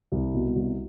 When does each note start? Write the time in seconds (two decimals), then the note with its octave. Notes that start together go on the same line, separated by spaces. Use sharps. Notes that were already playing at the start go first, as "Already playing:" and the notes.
0.12 C2
0.34 B2
0.56 C2